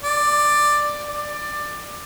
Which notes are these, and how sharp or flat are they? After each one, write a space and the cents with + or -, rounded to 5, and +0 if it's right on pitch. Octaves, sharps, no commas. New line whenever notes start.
D5 +10
D5 +15